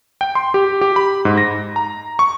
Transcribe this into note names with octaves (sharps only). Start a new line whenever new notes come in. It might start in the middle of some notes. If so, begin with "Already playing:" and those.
G5
C6
G4
G4
B5
G#2
A#6
A#5
C#6